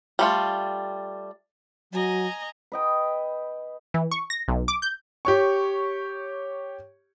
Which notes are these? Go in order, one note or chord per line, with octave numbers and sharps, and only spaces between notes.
G3 A3 F4
F#3 D#5 G#5 A#5
B4 D#5 G5
E3
C#6
A#6
B1
D6
G6
G4 C#5 C#6